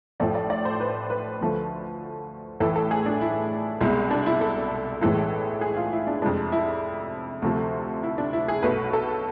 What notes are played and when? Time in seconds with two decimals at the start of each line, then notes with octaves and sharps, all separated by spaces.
0.20 A1 A2 F3 A3 D5
0.35 D5
0.50 D5
0.65 C5
0.80 B4
1.10 B4
1.41 D2 D3 F3 A3
2.60 A1 A2 E3 A3 A4
2.76 A4
2.91 G#4
3.06 D4
3.21 E4
3.81 C2 B2 G#3 E4
4.11 D4
4.26 E4
4.41 A4
5.01 A1 A2 E3 G#3 A4
5.61 G#4
5.77 F4
5.92 E4
6.07 D4
6.22 F2 C3 G#3 D4
6.52 E4
7.42 D2 C3 F3 A3
8.03 E4
8.18 D4
8.33 E4
8.48 G#4
8.63 B1 B2 A3 B4
8.93 A4